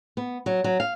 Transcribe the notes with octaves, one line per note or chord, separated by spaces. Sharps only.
B3
F#3
F#3
F5